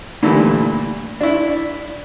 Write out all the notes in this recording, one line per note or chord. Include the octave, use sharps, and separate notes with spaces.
A#2 D3 E3 G3 A3
D4 E4